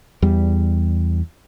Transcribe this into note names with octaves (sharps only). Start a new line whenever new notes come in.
E2 G3